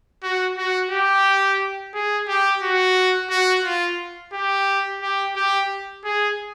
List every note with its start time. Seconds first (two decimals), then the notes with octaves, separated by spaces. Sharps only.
0.23 F#4
0.58 F#4
0.91 G4
1.95 G#4
2.28 G4
2.63 F#4
3.30 F#4
3.64 F4
4.33 G4
5.02 G4
5.36 G4
6.05 G#4